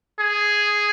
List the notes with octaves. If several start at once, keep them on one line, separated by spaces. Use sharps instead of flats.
G#4